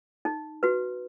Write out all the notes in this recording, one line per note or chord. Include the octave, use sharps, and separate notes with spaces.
D#4
F#4 B4